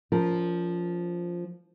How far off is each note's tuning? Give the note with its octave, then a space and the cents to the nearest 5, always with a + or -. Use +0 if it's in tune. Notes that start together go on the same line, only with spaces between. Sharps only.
F3 +0 C#4 +45 A#4 +0